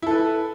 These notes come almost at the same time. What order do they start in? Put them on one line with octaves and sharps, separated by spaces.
E4 A4 B4